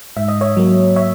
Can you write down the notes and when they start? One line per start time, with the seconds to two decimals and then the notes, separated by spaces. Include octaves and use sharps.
0.17 G#2 E5
0.28 D#5
0.41 C#5 E5
0.57 F#3 A#3
0.96 C#5 E5